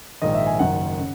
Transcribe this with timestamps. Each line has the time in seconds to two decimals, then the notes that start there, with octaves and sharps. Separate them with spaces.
0.22 A#1 G#2 D#3 D#5
0.35 E5
0.47 G#5
0.59 F#1 F#2 D#3 F#5
1.00 C#3